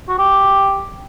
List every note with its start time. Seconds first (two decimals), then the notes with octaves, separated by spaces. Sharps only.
0.08 F#4
0.19 G4